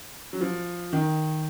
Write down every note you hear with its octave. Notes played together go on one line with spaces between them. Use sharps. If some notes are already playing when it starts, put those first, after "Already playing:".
F#3
F3
D#3